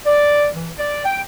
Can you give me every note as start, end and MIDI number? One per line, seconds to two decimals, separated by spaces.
0.06 0.47 74
0.53 0.70 52
0.79 1.01 74
1.05 1.20 79